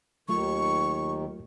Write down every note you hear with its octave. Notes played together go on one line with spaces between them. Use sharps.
D#2 D#3 F#3 A3 F4 C#6